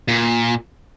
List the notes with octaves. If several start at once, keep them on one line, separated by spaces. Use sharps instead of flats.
A#2